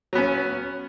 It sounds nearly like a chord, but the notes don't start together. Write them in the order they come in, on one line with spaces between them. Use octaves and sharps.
F#3 B3 C#4